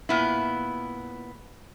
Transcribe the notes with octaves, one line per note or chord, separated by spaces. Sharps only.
A#2 B3 E4